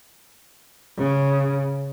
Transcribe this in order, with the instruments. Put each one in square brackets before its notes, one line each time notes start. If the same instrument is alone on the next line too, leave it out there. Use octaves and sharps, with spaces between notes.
[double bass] C#3